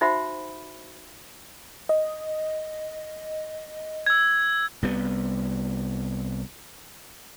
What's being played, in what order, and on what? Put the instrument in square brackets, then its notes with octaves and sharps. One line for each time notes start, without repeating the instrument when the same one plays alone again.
[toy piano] D#4 F#4 C5 E5 F#5 B5
[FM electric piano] D#5
[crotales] E6 G#6
[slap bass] C2 G3 B3